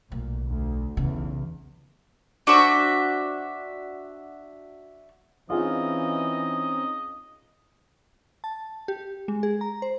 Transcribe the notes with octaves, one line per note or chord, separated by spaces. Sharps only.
B1 A#2 A3
D2
B1 E2 C#3
D4 F#4 C5 E5
E3 C4 C#4 D#4 F4 G#4 D#5 F5
A5
G4
G#3
G#4
A#5
C5